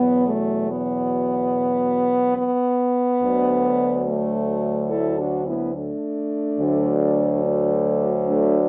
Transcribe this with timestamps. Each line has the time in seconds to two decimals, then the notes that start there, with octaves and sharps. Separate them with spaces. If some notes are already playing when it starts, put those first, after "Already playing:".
Already playing: E2 B2 F#3 B3
0.27 A3
0.69 B3
2.37 B3
3.22 D2 D3 F#3
4.07 A3
4.90 E4 A4
5.19 D4 F#4
5.46 B3 E4
5.75 A3 D4
6.59 D2 D3 F#3
7.44 A3 D4
8.29 A3 D4